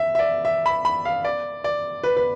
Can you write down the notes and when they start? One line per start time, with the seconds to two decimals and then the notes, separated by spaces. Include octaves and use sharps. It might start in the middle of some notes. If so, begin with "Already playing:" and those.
Already playing: E5
0.15 E5
0.19 D5
0.45 E5
0.66 B5
0.85 B5
1.05 F5
1.25 D5
1.64 D5
2.04 B4
2.17 B4